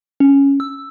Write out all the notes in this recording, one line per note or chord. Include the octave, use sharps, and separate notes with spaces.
C#4
E6